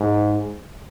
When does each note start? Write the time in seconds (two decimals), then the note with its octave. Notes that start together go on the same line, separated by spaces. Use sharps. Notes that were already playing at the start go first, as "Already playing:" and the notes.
Already playing: G#2